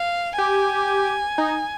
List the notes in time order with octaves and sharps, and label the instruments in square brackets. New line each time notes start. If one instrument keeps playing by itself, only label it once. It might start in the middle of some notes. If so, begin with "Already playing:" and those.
Already playing: [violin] F5
[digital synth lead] G4 [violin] G#5
[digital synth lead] D#4